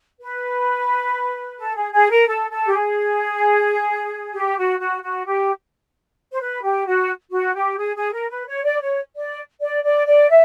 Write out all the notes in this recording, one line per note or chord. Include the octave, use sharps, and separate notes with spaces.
B4
A4
G#4
G#4
A#4
A4
A4
G4
G#4
G4
F#4
F#4
F#4
G4
C5
B4
G4
F#4
F#4
G4
G#4
G#4
A#4
B4
C#5
D5
C#5
D5
D5
D5
D5
E5